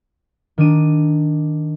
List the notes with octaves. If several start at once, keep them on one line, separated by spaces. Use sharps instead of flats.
D#3 D4 D#7